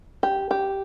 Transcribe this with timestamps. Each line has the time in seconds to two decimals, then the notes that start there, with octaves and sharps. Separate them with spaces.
0.23 G4
0.51 G4